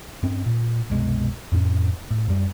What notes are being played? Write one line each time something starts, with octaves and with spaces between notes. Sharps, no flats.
G2 C4 C#4
A#2
C2 F#2 B2 G#3
F2 A2 C4 C#4
A2
F#2 G3